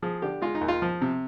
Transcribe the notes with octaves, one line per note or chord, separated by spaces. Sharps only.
F3 G#4
D3 G4
G#3 F4
D#4
D#2
F4
F3
C3